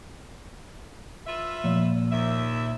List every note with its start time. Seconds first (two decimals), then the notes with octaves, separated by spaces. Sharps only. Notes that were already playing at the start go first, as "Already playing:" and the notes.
1.27 F4 B4 E5
1.64 A#2 F3
2.12 D#2 E5